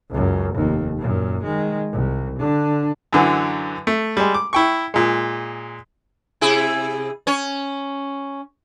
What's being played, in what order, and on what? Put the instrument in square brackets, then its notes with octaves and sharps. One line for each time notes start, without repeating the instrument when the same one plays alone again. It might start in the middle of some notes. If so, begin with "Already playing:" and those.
[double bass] C#2 F#2
F1 D#2
F#2 A#2
D#3 G#3
C2
D3 D4
[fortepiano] F#2 D3 E3 F#3
A3
G3 G#3
D6
E4 G5 C#6
A#2 G#3
[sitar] C3 E4 G#4
C#4 C#5